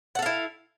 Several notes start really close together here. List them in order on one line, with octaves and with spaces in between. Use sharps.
F#5 A4 F5 E4